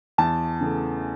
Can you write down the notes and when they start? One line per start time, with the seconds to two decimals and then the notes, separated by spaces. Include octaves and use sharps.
0.18 E2 A5
0.61 C#3 E3 A3